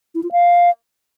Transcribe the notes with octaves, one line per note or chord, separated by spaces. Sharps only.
E4
F4
F5